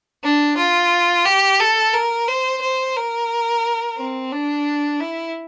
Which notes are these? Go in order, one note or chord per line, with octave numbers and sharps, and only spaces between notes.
D4
F4
G4
A4
A#4
C5
C5
A#4
C4
D4
E4